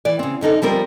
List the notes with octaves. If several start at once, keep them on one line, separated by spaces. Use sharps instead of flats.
E3 D5
C#3 C4
F#2 D3 D#4 A4
F3 G3 C4 A#4